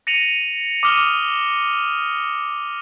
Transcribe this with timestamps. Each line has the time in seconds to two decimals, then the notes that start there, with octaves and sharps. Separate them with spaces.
0.07 A#6 C#7 D#7 F7 F#7
0.83 D6 D#6 F6 D#7 G7